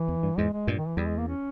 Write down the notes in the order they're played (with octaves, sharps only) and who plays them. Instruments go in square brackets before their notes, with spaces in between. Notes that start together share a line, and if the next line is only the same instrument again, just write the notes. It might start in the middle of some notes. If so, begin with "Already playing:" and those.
Already playing: [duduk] E3
[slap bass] E2
G2
[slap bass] E2 G#2 [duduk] G#3
[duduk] G#3
[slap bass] G2 A#2
[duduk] D#3
E3
[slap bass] E2 [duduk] G3
[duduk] G#3
A#3
C#4